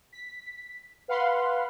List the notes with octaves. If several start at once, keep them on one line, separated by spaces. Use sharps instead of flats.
B6
B4 F5 F#5 B5 C6